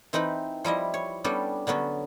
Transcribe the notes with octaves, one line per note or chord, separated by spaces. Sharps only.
E3 C4 D#4 B4 B5
F3 G3 E4 D#5
C#5
G3 B3 C#4 D4 G4 A4
D3 F#3 B3 C#4